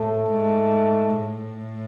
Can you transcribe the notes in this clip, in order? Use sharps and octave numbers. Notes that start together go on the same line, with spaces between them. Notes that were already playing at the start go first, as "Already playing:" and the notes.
Already playing: A2 A3
G#2
A2